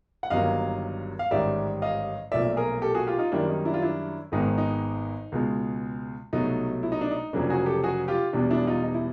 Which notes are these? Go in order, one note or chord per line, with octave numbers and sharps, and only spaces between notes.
F#5
G1 G2 D#3 F#3 A#3 D#5 F5
F5
A1 G#2 D#3 G3 D5 E5
D#5 F5
B1 A#2 F3 A3 D5 E5
G#4 A#4
G4 A4
F#4 G#4
F4 G4
D#4 F4
F#2 D#3 G3 A#3 D4 E4
D#4
D4 E4
F4
D4 E4
G#1 G#2 D#3 G#3 B3 D#4
D#4
C#2 B2 G#3
C2 B2 F#3 A3 D#4
E4
D#4
D4
D#4
F1 F2 C#3 F#3 A#3 D4
F#4 G#4
G4 A4
F#4 G#4
F4 G4
E1 E2 B2 G3 D4
D4 E4
D#4 F4
D#4
E4